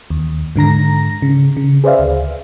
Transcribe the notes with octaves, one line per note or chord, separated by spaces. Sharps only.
D#2
G#2 D3 A#5 A#6
C#3
C#3
G#4 B4 C5 D5 E5 F5
D2